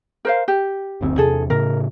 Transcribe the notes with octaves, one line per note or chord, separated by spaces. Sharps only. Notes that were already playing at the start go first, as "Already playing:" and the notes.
A#4 C5 F5
G4
F#1 D2 C4
E2 C3 G#4 A4
A2 C#3 A#4